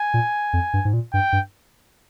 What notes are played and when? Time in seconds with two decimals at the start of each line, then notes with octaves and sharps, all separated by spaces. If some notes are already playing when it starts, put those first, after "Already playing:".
Already playing: G#5
0.14 A#2
0.53 F2
0.73 G2
0.85 G#2
0.93 A#2
1.13 G2 G5
1.33 G2